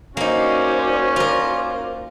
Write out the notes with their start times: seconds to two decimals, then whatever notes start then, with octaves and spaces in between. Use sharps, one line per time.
0.17 A#3 C#4 D#4 F#4 C5 D5
1.16 F4 A#4